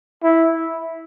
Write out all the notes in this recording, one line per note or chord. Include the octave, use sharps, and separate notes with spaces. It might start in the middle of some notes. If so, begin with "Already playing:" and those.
E4